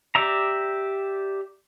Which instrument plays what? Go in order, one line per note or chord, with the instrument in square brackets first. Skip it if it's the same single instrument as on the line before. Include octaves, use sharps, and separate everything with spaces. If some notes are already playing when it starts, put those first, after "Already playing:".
[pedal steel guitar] G4 D5 E5 A#5